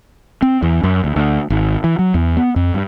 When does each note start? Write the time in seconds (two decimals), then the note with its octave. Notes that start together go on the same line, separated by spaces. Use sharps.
0.42 C4
0.62 E2
0.83 F#2
1.04 D2
1.16 D2
1.50 G#1
1.84 E3
1.99 F#3
2.14 E2
2.37 B3
2.56 F2
2.74 G2